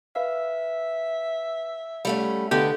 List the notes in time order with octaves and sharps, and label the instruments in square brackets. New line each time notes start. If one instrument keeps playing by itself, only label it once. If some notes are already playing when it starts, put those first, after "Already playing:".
[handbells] B4 F5 E6 [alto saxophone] E5
[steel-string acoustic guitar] G3 A3 C#4 [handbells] F5 F#5
[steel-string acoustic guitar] D3 B3 [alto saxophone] G4 [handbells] A4 D#5 F5